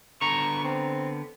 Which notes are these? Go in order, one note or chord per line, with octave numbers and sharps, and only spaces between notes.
D3 B3 A#5 C#6
C4